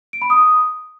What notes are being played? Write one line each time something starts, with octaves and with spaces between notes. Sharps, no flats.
D7
B5
D#6